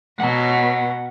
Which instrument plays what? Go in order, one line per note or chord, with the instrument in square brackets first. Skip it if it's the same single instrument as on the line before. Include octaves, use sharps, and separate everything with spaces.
[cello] B2 [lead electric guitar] F#5 A#5